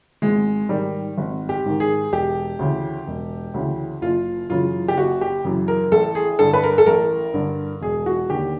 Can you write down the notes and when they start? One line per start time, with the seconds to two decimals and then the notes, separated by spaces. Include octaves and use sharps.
0.22 G#1 G#3
0.69 G#2 D#3 G3
1.18 G#1
1.49 G4
1.65 G#2 D#3
1.80 G#4
2.12 E1 G4
2.59 D2 C#3 E3
3.07 E1
3.54 D2 C#3 E3
4.02 F#1 F4
4.49 F#2 C#3 E3 F4
4.88 G4
4.96 F#1 F#4
5.21 G4
5.45 F#2 C#3 E3
5.68 A#4
5.92 A1 A4
6.15 G#4
6.39 G2 D3 A4
6.53 B4
6.64 A#4
6.78 A4
6.86 A1 A#4
7.34 G2 D3
7.81 E1 G#4
8.06 F#4
8.29 D#2 D3 G4